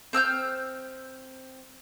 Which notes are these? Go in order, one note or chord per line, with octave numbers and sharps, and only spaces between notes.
C4 E6 F6 G6